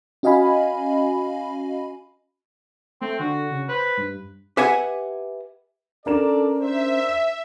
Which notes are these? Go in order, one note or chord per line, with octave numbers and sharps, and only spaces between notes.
C#4 F#4 D#5 F5 G#5 B5
A3 C4
D3 F#4
C#3
B4 C5
G2
G4 B4 E5 F#5 G#5
C#4 D4 A4 A#4 D5 E7
C5 E5